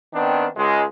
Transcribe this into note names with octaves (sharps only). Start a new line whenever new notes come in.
D#3 B3 C4 D4
C#2 G#3